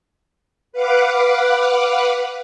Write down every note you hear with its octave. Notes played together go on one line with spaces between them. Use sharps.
B4 F5 F#5 D6